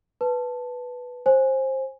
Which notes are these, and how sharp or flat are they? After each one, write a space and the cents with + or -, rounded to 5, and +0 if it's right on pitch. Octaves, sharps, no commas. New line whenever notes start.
B4 +0 A5 +0
C5 +20 G#5 +0